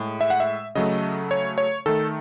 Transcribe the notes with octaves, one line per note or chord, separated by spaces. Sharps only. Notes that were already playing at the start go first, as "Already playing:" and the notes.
Already playing: A2 G#3
E5
F#5
E5
C#3 F#3 A3 D#5
C#5
C#5
D#3 A3 A4